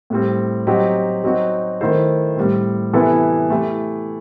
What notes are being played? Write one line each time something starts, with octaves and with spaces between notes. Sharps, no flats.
A2 G3 C4
F#3 C4 D#4 G4
F#3 C4 D#4 F#4
D#3 A3 E4 A4 C5
A2 G3 C4
C3 E3 B3 E4 A4
A3 E4 G4